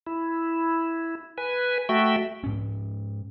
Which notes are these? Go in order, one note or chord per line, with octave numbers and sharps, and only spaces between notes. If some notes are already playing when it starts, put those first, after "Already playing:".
E4
B4 G#5
A3 F#4 E5 G5
G#2 C#4